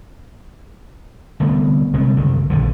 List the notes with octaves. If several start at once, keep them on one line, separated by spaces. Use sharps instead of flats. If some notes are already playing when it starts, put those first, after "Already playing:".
C2 D3 A3 B3
C2 C3 G#3 A3
F#1 C2 D3 D#3
A#1 D3 D#3 F3